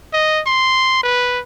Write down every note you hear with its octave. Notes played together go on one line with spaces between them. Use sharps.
D#5
C6
B4